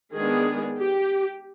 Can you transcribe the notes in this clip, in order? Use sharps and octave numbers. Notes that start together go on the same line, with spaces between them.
D#3 G#3 B3 D4 G#4
G4